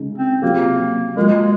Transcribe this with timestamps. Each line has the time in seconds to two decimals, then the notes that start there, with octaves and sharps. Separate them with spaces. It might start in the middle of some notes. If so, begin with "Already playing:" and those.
Already playing: C#3 G#3 D#4
0.18 C4
0.42 C3 F#3 A#3 C4 F4 G#4
1.17 F#3 G#3 A#3 F4 A#4